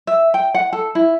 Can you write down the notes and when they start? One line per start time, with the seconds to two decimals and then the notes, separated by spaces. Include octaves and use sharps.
0.07 E5
0.34 G5
0.54 F#5
0.73 A4
0.95 E4